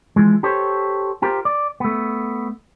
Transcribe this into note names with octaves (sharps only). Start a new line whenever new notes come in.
E3 F3 G#3
G4 A4 C5 C#5
F4 G4 A#4 C5
D5
A3 B3